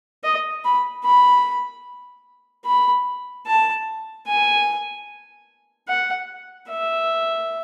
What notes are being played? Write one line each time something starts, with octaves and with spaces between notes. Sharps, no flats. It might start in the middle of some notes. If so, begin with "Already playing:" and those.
D#5
B5
B5
B5
A5
G#5
F#5
E5